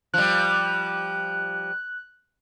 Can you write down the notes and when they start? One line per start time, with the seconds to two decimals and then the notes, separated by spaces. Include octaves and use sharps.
0.14 F3 G3 F#6